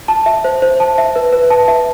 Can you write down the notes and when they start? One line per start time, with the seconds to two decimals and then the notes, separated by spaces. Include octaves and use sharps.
0.08 A5
0.26 E5
0.44 C5
0.62 C5
0.80 A5
0.98 E5
1.16 B4
1.33 B4
1.50 A5
1.68 E5